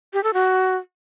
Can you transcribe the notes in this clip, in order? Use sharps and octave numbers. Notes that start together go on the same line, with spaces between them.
G4
A4
F#4